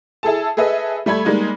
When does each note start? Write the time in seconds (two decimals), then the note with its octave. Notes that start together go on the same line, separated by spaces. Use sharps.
0.23 E4 G#4 A4 A5
0.57 G#4 A4 B4 D#5 E5
1.06 G3 A3 B5 G#6
1.25 G3 G#3 A#3 D#4